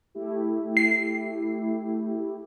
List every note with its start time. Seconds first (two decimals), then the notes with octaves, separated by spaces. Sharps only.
0.15 A3 E4 G4
0.77 C7